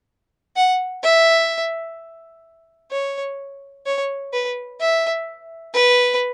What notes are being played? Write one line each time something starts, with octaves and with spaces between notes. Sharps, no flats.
F#5
E5
C#5
C#5
B4
E5
B4